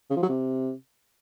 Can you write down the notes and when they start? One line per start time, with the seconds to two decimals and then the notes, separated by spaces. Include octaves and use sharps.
0.10 C#3
0.16 F3
0.22 F#3
0.29 C3